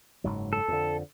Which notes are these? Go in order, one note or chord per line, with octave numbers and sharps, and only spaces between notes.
F#1 G#2 F#3
A4
F2 D3